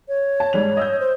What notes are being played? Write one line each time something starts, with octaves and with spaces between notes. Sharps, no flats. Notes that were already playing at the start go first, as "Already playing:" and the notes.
C#5
A5
G#2 G3 F7
D#5 E6 G6
C5